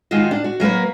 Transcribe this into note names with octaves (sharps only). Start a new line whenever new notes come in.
D#3 G#3 D#4 F4 F#4
D4
F#4
F#3 A#3 A#4 B4